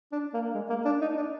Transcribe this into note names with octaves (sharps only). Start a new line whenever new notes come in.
D4
A#3
G#3
A#3
D4
D#4
D4